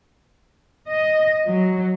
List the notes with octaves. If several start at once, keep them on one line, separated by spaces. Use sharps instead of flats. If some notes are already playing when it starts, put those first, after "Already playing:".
D#5
F#3